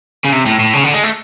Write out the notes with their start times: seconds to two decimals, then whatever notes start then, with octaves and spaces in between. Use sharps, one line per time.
0.25 C#3
0.33 C3
0.46 A2
0.60 A2
0.74 C#3
0.84 D3
0.94 G#3
1.03 A3